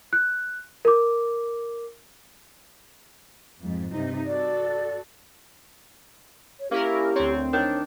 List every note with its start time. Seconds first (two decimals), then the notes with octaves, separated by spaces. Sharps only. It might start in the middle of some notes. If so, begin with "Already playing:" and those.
0.13 F#6
0.85 A#4 D6
3.60 F2 G#2
3.91 G2 C3 D#4
4.26 F#4 A4 D5
6.60 C#5
6.71 A#3 C#4 E4 G4 A#4
7.16 D2 C4 C#5
7.53 D#3 D4 C#5